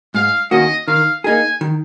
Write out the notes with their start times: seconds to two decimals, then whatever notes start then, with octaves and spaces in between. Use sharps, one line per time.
0.14 G#2 F5
0.51 D#3 A#3 C#4 F#4 D#5
0.87 D#3 F5
1.24 A#3 D#4 G#4 G#5
1.61 D#3